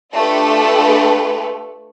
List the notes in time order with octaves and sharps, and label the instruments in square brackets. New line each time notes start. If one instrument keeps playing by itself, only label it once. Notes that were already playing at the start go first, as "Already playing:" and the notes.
[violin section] A3 D4 F4 G4 A4 B4